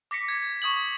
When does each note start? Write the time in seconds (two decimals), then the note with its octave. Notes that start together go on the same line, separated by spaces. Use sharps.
0.11 D6 A#6 B6 C#7
0.28 G#6
0.62 C#6 D#6 G#6 F#7